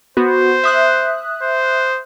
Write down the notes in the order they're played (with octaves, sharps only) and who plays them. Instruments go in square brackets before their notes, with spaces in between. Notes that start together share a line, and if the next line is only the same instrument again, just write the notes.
[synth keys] B3 F#4 [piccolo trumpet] C5
[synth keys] E5 D#6 F#6
[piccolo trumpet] C5